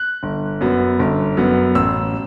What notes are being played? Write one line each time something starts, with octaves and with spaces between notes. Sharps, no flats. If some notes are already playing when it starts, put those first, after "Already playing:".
Already playing: F#6
G1
F#2 F#3 B3
G1
F#2 F#3 B3
A1 E6